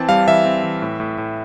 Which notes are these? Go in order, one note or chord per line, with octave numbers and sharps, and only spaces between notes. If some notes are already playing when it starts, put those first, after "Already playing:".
Already playing: E3 C4 A5
G3 F5
E3 E5
C4
E3
A2
A2
A2